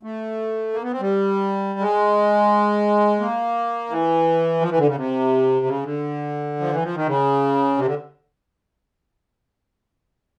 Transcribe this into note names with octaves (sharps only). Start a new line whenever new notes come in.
A3
A#3
B3
C4
G3
G#3
A#3
E3
F3
E3
D3
C#3
C3
C#3
D3
F3
E3
F3
D#3
C#3
C3
D3